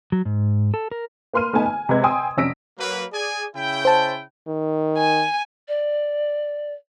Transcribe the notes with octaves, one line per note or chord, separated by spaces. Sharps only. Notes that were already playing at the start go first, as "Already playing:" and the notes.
F#3
G#2
A4
A#4
A#3 B4 C6 F6 D#7
A3 B3 D#4 G#5 A5
G#5
C3 G#3 B4 G#6
G5 G#5 C6 D#6 E6
F1 C#4 E6 A#6 B6 D7
F#3 A#3 B4
G#4 D5 G#5
C#3 E4 G5
C5 A5
D#3
G#5
D5